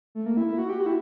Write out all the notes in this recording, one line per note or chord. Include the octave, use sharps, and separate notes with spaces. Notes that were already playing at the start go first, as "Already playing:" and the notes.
A3
A#3
E4
E4
F#4
G4
F#4
E4